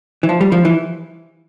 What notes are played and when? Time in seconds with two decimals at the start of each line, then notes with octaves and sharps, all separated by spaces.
0.23 E3
0.29 F3
0.41 G3
0.52 F3
0.65 E3